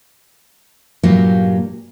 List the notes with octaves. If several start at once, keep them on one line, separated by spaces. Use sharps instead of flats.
G2 A#2 F#3 A#3 G4